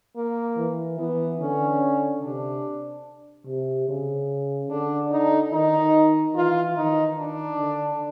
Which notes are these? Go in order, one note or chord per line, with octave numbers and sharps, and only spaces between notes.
A#3
E3
E3 B3
D3 C#4
C3 D4
C3
C#3
D3 D4
D#4
D#3 D#4
E3 F4
D#3 D#4
D4
D3